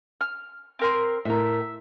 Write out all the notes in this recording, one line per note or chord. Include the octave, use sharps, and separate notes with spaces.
F6
C4 A#4 C6
A2 A#4 E5